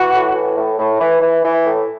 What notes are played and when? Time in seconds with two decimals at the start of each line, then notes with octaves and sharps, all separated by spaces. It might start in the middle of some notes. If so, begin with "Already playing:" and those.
Already playing: E3 F#4
0.14 A2
0.35 E3
0.56 A2
0.78 A2
1.00 E3
1.21 E3
1.44 E3
1.64 A2